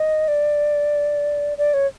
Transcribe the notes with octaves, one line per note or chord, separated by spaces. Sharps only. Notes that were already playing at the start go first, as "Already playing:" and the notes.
Already playing: D#5
D5
D5
C#5